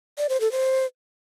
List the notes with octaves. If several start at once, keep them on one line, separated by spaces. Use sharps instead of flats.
D5
C5
A4
C5